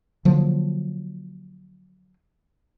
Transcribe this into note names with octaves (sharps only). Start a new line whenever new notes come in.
D3 F3 F#3 A#3